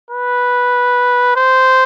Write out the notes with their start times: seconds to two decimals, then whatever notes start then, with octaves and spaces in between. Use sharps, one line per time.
0.10 B4
1.36 C5